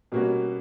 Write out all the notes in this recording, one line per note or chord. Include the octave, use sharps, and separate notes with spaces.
B2 G3 A#3 C#4 F#4